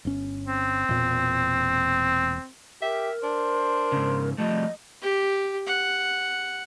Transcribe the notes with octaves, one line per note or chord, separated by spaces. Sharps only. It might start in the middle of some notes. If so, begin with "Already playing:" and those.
G1 C#4
C4
E1 A#2
G4 A#4 E5
D4 C5
G#2 C#3
F3 G3 A3 D#5
G4
F#5